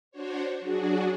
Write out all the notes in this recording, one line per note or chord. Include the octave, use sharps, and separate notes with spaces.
D4 F#4 C5 C#5
F#3 D4 F#4 G#4